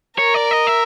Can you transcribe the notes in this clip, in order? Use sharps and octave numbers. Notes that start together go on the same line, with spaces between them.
A#4 C#5
D5
D#5
E5